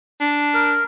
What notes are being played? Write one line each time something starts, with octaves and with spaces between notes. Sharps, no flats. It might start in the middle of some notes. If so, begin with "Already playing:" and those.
D4
A#4